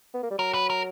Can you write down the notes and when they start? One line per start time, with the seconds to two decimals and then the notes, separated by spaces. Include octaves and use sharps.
0.14 B3
0.23 A#3
0.31 G3
0.38 F#3 A#4
0.54 B4
0.70 A#4